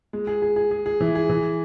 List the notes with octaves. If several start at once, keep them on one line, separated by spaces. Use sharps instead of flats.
G#3
G#4
G#4
G#4
G#4
G#4
E3
G#4
E3